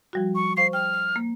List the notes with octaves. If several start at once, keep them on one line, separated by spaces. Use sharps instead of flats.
F3 G3 F#4
C#6
C5 F5 C#6 C7
G5 F6
A#3